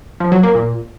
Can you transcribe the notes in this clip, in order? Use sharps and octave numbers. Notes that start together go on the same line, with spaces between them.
F3
F#3
A#3
A#2